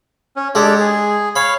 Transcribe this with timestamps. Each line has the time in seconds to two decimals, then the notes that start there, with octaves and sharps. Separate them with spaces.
0.36 C#4
0.55 G#3 D4 G4 A4
0.80 G#4
1.36 C#5 F5 B5